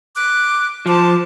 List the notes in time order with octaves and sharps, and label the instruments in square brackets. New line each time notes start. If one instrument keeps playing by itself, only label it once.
[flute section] D6 F#6
[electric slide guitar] F3 [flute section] C5 A5 D6